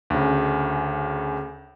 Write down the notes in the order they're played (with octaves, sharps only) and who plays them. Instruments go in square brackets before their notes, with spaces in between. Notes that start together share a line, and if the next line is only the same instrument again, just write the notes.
[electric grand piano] D2 C#3